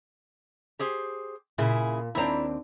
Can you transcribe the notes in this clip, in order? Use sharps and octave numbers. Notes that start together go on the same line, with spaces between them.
G4 G#4 C5
A#2 C#3 E4 G#4
D#2 C4 D4 E4 A#5